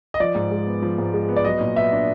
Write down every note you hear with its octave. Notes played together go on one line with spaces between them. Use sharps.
D#5
F3 D5
G#2
G#3
B3
F3
G#2
G#3
B3
D5
F#3 D#5
A#2
B3 E5
D4